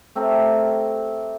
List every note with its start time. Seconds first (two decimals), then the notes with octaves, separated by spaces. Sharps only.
0.15 A3 C4 G4 A#4